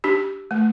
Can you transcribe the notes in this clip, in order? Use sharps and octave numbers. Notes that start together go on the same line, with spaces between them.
D4 G4
A3